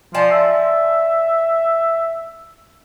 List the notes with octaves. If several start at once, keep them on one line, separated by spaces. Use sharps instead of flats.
F3 D5 G#5 A5
E5